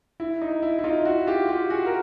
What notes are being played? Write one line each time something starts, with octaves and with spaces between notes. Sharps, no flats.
E4
D#4
E4
E4
D#4 F4
E4 F#4
F4 G4
F4 G4
F#4 G#4
A#4